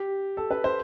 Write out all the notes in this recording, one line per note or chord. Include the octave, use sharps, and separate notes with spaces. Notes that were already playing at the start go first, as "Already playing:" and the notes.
Already playing: G4
A4
B4
C5